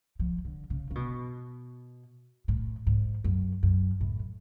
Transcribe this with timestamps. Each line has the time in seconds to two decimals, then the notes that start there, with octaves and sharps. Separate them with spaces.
0.19 F3
0.45 D3
0.70 C#3
0.90 C#3
0.95 B2
2.48 A2
2.87 G#2
3.24 F#2
3.63 F#2
4.01 A2